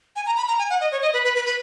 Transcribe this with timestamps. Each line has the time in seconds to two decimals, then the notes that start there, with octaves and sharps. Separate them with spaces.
0.16 G#5
0.26 A#5
0.37 B5
0.48 A#5
0.59 G#5
0.70 F#5
0.81 D#5
0.92 C#5
1.02 D#5
1.13 B4
1.24 B4
1.35 B4
1.46 B4